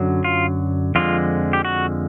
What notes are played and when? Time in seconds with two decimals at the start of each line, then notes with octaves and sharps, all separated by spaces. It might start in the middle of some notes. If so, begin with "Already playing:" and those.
Already playing: F#2 D3 F#3
0.24 F4
0.95 F2 D3 F3 G#3 F4
1.53 G4
1.65 F#4